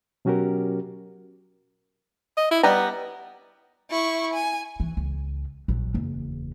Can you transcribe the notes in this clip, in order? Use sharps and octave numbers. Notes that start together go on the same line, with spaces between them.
B2 F#3 C#4 F#4 G4 A#4
D#5
E4
G3 B3 D#5 A#5
E4 C#6
G#5
E3
C#2
A#1 F#3
F#1 E2